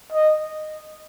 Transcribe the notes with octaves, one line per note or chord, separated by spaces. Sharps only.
D#5